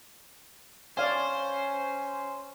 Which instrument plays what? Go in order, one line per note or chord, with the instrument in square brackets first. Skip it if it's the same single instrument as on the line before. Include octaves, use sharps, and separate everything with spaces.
[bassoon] C#4 [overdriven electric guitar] C5 [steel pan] D5 F5 G#5